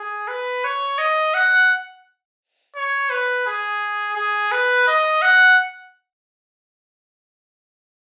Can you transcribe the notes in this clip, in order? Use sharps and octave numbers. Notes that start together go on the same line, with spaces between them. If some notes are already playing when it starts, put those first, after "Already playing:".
Already playing: G#4
B4
C#5
D#5
F#5
C#5
B4
G#4
G#4
B4
D#5
F#5